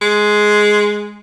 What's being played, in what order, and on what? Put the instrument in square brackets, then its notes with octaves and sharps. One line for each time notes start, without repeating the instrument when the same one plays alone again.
[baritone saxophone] G#3